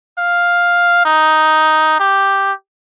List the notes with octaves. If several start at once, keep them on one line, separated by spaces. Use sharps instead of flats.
F5
D#4
G4